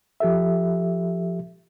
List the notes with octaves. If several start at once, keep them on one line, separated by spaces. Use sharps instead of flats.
F3 G4 A4 E5